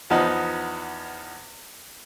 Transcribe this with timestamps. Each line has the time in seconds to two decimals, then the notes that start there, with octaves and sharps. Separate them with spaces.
0.10 E2 F3 B3 D#4